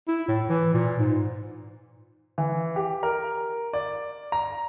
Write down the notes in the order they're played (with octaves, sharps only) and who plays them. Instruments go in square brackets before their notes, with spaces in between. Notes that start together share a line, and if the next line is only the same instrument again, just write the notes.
[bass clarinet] E4
A2
E3
A#2
G#2
[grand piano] E3
G4
A#4
D5
A#5